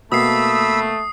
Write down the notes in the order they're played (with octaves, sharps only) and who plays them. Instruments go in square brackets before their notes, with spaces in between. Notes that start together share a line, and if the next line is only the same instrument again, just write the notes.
[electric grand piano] B2 A#3 [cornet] A3 [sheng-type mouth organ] B5 E6 [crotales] D#6 C7